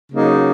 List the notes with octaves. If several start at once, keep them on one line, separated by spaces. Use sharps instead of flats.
C#3 F#3 A#3 D#4